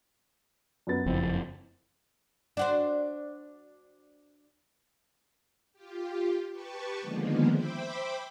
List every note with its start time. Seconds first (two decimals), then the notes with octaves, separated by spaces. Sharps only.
0.87 F#2 B3 A6
1.06 F#1 F2 C4 E4
2.57 D4 F#4 C5
5.73 F4 G4
6.52 G4 B4 A5 C#6
7.01 D3 D#3 F3 G#3 A#3 B3
7.50 C5 E5 G5 B5 D6